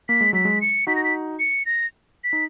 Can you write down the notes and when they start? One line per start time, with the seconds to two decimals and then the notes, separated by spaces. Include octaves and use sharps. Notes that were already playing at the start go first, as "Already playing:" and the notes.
0.09 A#3 B6
0.21 G#3
0.33 F#3 B6
0.45 G#3
0.61 C#7
0.87 D#4 F#4 B6
0.95 A#6
1.04 B6
1.39 C#7
1.66 A#6
2.24 B6
2.33 D#4